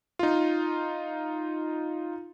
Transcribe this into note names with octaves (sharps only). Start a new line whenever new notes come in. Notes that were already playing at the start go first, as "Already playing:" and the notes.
D#4 F4